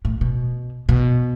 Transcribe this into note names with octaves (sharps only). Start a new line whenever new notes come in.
A2
B2
B2